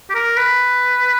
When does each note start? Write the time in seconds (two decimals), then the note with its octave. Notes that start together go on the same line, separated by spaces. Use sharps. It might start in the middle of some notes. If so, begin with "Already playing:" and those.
0.10 G4
0.15 A#4
0.37 B4